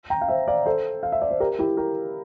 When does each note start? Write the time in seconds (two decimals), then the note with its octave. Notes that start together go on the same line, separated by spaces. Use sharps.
0.10 G5 A#5
0.21 F5
0.28 C5 E5
0.48 D5 F5
0.66 A4 C5
1.03 F5
1.12 E5
1.22 D5
1.31 C5
1.40 G4 A#4
1.59 E4 G4
1.77 G4 A#4